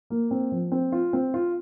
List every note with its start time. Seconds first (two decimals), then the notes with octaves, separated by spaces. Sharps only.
0.10 A#3
0.31 C4
0.52 F3
0.72 C4
0.92 F4
1.13 C4
1.34 F4